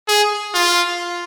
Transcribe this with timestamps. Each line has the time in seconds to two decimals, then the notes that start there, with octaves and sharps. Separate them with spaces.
0.08 G#4
0.54 F4